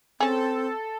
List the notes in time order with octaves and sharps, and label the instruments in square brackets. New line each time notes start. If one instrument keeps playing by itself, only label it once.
[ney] C4 [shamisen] C#4 G#4 [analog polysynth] A4